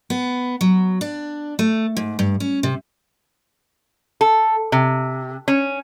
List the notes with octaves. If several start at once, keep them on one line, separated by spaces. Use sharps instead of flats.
B3
F#3
D4
A3
G#2
G2
C#4
C3
A4
C3
C#4